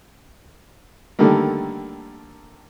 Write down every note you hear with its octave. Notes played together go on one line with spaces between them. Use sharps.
D3 D#3 G3 A3 A#3